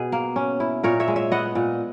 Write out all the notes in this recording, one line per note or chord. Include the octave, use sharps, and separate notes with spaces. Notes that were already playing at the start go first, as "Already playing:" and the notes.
Already playing: B2 G#4
A#3
C#4
E4
A#2 A#4 C#5
C#5 E5
G#3
C#5 E5
B3 D#5 F#5
A#2